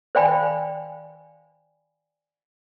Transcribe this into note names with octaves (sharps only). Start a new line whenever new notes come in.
C5 D5 F5 G5 G#5 B5